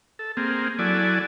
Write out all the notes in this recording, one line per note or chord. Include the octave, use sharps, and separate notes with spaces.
A4
A#3 C4 G#4
F#3 E4 A4 D5 G#5